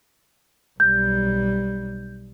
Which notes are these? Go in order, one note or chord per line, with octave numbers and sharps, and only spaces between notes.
B1 G3 G6